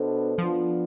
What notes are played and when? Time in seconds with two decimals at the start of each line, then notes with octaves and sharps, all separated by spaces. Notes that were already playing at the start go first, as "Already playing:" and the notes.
Already playing: B2 B3 D4 A4 C5
0.38 F3 B3 D4 F4